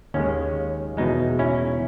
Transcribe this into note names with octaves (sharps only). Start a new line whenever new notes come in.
D#2 D#3 G#3 C#4
E2 B2 G#3 D#4
C#4 E4